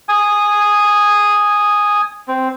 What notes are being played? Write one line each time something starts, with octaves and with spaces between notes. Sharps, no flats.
G#5 D#6
C4